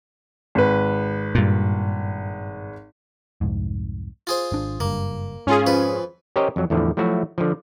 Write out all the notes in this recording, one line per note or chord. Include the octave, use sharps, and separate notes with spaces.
G#1 B4
G2 A#2
C2 F2 G#2
F4 G#4 C5
G#1 D4
F#1 G2 A#3
G#2 C#4 F4 G#4
F2 B4
C#4 G4 A#4 C5 C#5 D#5
F2 F#3
E2 A2 D3 F3
F3 F#3 A3 E4 F#4
D3 F3